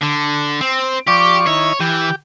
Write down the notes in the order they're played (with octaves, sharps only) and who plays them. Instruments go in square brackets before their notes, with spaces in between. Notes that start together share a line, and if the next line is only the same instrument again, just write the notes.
[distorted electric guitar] D3
C4
[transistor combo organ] F3 D5 C#6 [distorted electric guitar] G4
[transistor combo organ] D#3 E4 [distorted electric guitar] C#5
[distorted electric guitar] E3 [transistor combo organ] G4